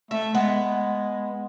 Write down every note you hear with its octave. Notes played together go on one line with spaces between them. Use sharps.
A3 E5
G#3 B3